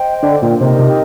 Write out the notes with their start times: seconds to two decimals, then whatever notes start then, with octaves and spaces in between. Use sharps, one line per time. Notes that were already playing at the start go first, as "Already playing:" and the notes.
Already playing: C5 D#5 G5
0.22 D3
0.42 A#2
0.60 C3 D#4 G4 A#4 D#5
0.79 C3